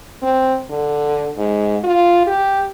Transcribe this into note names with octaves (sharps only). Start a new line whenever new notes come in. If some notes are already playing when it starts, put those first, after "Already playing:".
C4
D3
G#2
F4
G4